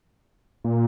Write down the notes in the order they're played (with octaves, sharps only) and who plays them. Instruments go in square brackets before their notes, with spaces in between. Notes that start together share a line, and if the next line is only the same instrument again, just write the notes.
[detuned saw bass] A#2